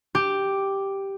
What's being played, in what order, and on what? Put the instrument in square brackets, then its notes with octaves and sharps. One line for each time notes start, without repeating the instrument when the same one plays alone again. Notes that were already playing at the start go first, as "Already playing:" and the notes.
[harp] G4